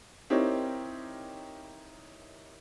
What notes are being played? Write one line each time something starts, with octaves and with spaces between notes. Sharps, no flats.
C4 D#4 E4 G4 A#4 C#5